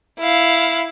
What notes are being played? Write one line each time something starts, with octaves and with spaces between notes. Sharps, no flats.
E4 F5